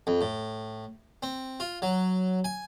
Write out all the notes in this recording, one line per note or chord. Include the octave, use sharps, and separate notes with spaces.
F2
A2
C4
F4
F#3
G#5